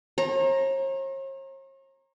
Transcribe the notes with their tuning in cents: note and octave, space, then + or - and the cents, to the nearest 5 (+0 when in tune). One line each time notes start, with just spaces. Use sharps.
C#5 -45 A#5 +0